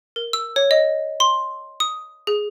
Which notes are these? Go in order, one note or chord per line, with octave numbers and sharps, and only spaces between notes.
A#4
E6
C#5
D#5
C6
D#6
G#4